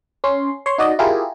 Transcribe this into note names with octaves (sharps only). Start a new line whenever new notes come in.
C#4 C6
C#5 C6
D#4 F#4 D5 D#5
E4 F4 G4 G#4 A#4